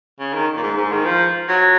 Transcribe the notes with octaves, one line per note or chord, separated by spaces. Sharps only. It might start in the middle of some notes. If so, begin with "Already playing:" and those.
C#3
D#3
A#2
G#2
G#2
D#3
F3
F#3